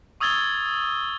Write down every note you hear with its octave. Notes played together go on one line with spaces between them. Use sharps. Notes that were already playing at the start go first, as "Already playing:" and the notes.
C#6 D#6 E6 G#6 A6 G7